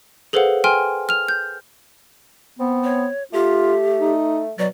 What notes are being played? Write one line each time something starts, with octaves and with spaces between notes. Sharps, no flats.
G#4 A4 B4 C5 F5 F#5
G5 G#5 C6 F6
F6 F7
G6
B3 C4
C#5
A3 F4 G4
D#4
B2 F#3 D5